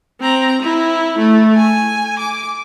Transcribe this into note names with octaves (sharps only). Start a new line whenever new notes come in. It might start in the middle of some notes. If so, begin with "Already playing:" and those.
C4 A#5
E4
A3
G#5
D6